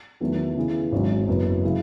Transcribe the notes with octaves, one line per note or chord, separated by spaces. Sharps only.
E2 D#3 F#3 A3
C#3 E3 B3 E4 G#4
G#1 G#2 F#3 C#4
F#1 F#2 E3 B3
C#3 F#3 C#4 E4 G#4